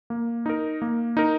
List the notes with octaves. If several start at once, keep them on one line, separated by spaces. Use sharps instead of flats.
A#3
D#4 A#4
A#3
D#4 A#4